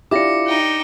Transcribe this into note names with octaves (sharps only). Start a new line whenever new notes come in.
D4 E4 F4 G4 D6 A#6 C#7
D#4 G5